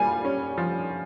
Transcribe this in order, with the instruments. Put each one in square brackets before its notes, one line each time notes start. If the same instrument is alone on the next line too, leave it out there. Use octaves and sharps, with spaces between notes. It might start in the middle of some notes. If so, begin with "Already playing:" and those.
Already playing: [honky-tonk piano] G3 F4 [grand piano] G#5
[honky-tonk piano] C#4
F3